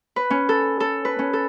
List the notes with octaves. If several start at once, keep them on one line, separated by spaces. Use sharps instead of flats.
B4
C#4
A4
A4
B4
C#4
A4